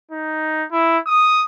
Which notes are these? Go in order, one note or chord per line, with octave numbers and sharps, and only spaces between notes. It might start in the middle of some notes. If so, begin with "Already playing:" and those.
D#4
E4
D#6